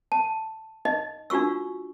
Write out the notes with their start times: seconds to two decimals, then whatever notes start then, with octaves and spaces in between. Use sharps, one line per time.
0.12 A5
0.85 D#4 D#5
1.30 D4 F4 F#4 C#6 E6